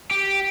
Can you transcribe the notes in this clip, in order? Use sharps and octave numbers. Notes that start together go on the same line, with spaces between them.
G4